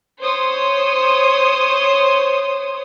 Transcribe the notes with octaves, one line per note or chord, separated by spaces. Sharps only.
C5 C#5 D#6